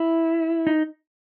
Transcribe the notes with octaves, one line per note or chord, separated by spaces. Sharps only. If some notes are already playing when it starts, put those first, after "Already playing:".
Already playing: E4
D#4